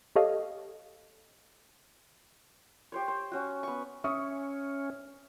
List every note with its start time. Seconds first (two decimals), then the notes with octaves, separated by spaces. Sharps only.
0.16 G4 A4 C#5 D#5 F5
2.92 G4 C5 C#5
3.08 C5
3.32 C#4 F#4
3.63 B3 C#6
4.04 C#4 E5 C#6 D#6